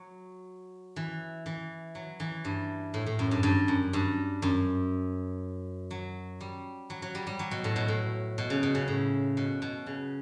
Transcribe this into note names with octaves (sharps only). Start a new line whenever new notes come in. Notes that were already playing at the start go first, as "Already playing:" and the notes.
Already playing: F#3
E3
E3
F#3
E3
G2
A2
A2
F#2
G2
G2
F#2
G2
F#2
F#3
G3
F#3
F#3
G3
G3
F#3
B2
A2
B2
A2
B2
C#3
B2
C#3
A2
B2
B2
C#3